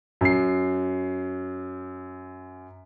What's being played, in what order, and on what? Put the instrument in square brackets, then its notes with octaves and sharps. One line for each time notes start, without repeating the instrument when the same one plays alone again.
[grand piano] F#2 C7